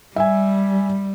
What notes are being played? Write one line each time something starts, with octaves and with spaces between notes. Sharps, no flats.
G3 E5 G#5